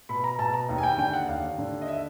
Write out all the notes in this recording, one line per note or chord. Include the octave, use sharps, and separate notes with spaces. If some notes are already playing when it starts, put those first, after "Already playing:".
B2 B5
A#5
B2 A5
A#5
D#2
G#5
G5
D3 G5
F#5
D#2 F5
D3
D#5
E5